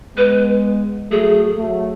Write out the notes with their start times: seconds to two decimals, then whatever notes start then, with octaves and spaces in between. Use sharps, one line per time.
0.16 G#3 B3 B4
1.11 F#3 A3 G#4
1.57 F#3 A3